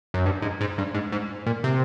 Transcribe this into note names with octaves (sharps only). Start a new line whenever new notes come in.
F#2
G2
G#2
G#2
G2
G#2
G#2
A#2
C3